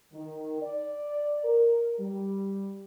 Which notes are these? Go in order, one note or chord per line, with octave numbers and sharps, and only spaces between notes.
D#3
D5
A#4
G3